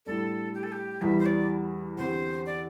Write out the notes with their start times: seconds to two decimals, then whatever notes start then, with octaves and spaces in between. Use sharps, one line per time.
0.06 A2 G3 D4 A4
0.54 G4
0.63 A4
0.72 G4
1.02 E2 E3 G3 E5
1.19 C5
1.26 D5
1.97 E2 D3 C4 G4 C5
2.46 D5